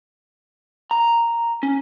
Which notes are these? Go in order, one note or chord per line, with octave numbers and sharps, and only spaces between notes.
A#5
C#4